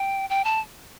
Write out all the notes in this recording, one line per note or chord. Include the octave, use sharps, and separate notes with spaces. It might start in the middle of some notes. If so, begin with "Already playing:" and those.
Already playing: G5
G5
A5